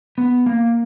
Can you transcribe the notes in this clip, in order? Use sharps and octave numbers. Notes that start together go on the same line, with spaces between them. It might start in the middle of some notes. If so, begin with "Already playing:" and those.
B3
A#3